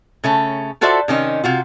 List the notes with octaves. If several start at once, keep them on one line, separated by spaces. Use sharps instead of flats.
C#3 A3 C#4
F4 F#4 A4 C5 D5 E5
C3 D#3 C#4 D#5
C3 F4 F#4